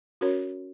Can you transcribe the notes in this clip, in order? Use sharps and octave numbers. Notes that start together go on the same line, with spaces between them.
C#4 F#4 A#4 C#5